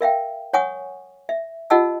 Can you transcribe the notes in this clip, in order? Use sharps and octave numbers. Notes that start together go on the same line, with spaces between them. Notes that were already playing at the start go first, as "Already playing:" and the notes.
A#4 E5 F5 G5
C#5 F#5 G#5 C#6 D#6
E5
F4 G4 D#5 F#5 A5 E6